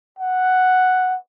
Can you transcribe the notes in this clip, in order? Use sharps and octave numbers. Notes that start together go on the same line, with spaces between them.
F#5